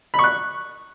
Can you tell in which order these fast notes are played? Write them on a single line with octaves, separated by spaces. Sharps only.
B5 C#6 F#6